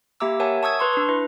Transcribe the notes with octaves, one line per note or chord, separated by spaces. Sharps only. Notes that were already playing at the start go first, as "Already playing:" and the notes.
A#3 G4 E5 A#5 D6 E6
A#4 C#5 E5 F#5 G#5 A5
A5 C#6 D#6 E6 G#6
B4 C6 C#6
D4 B4
D4 E4 B4